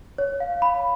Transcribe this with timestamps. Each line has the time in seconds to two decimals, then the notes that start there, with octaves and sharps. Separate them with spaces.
0.18 C#5
0.40 F5
0.62 B5